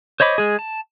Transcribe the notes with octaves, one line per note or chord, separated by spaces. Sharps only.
C5 C#5 D#5 B5 D6
G#3 G#4
A5